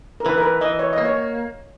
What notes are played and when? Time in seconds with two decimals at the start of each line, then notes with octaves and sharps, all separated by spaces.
0.20 A#4
0.26 E3 B4
0.38 A#4
0.43 B4
0.61 E3 D#5
0.79 C#5
0.93 A#3 D#5
1.05 C#5